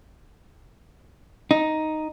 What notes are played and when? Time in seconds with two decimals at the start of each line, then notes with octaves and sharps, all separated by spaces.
1.51 D#4